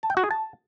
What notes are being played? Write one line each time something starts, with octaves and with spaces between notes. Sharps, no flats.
A5
G5
F#4
G#4
A5